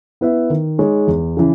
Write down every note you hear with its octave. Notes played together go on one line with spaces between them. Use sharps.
B3 E4 B4 E5
D#3
G#3 D#4 G#4 C#5
E2
C#3 E3